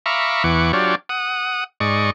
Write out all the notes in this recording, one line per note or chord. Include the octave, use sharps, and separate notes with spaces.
E5 F5 A#5 B5 C#6 D6
E2 E3 F#5 C#6 D6
F#3 D4 F4 G4 C#5 D5
F#5 D#6
G#2 D5 D#5 C#6